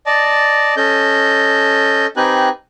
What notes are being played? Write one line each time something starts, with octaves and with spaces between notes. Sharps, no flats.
D5 D#5 A5
C#4 A4 D#5 G6
C4 D#4 G4 B4 G#5 F#6